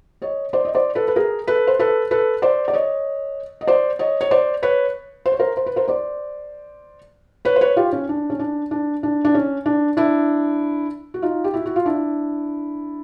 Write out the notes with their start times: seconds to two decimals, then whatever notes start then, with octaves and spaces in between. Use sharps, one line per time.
0.22 C#5 D#5
0.53 C5 D5
0.65 D#5
0.75 C5 D5
0.95 A4 B4
1.08 B4
1.16 G#4 A#4
1.47 A4 B4
1.67 C5
1.79 A4 B4
2.11 A4 B4
2.42 C5 D5
2.68 D5
2.73 C#5 D#5
3.61 D#5
3.67 C5 D5
3.99 C#5 D#5
4.21 C#5
4.31 C5 D5
4.63 B4 C#5
5.26 C5
5.32 C#5
5.39 A#4 C5
5.57 C5
5.66 B4
5.76 A#4 C5
5.88 C5 D5
7.45 B4 C#5
7.56 C5
7.61 B4 C#5
7.76 F4 G4
7.93 C#4
8.09 D4
8.30 C#4
8.39 D4
8.71 D4
9.03 D4
9.25 D4
9.34 C#4
9.66 D4
9.97 D4 E4
11.14 F#4
11.22 D#4 F4
11.44 G4
11.54 E4 F#4
11.66 F#4
11.76 F4
11.85 D4 E4